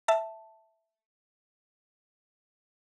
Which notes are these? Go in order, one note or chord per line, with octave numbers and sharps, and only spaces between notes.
E5 A5